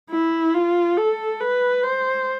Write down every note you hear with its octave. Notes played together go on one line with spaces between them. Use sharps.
E4
F4
A4
B4
C5